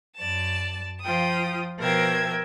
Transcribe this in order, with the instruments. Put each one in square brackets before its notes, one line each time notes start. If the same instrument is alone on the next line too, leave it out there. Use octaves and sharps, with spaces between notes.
[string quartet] F#2 D5 A5
F3 F4 G5 D#6
B2 F3 A#4 E5 G5 G#6